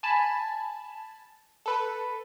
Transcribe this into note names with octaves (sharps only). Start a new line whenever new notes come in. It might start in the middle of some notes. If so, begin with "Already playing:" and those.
G#5 A5 B5
A4 B4